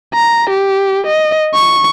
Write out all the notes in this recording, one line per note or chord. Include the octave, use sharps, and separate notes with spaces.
A#5
G4
D#5
C#6